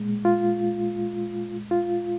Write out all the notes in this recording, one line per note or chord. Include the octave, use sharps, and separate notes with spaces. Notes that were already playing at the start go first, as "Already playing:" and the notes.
Already playing: A#2 G#3
F4
F4